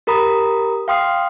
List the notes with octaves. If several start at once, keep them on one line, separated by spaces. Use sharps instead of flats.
G4 A#4 A#5 B5 D#6
F5 G5 C6 D#6 F6 C7